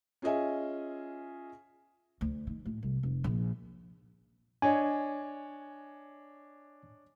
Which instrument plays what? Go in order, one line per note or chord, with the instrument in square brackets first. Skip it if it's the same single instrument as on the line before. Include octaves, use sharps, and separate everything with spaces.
[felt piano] C#4 F4 G#4 D#5 E5 G#5
[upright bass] D2
D#3
A2
C2
F1
A#1
[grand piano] D4 C#5 D#5 [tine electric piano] G#5